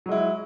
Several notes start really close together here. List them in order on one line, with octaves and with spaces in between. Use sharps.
F#3 G#3 E4